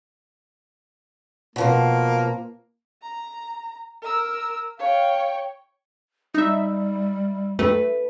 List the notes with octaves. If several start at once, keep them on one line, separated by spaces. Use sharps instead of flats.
B2 F3 A#3 C5
A#5
A#4 E6
C#5 F5 G5
G3 D#4 E5
A3 B4